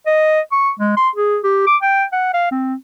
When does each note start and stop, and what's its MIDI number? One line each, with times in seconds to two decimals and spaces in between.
0.06 0.40 75
0.52 0.71 85
0.79 0.93 56
0.97 1.09 84
1.15 1.38 68
1.43 1.62 67
1.67 1.76 86
1.82 2.04 79
2.12 2.33 78
2.34 2.48 77
2.51 2.74 60